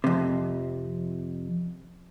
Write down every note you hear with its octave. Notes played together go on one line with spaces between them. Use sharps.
F2 C3